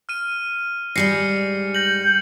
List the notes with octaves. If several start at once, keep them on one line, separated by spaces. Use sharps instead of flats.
F6 D#7
G#2 G3 G#4 A#6 C7 C#7
G6 A#6 F#7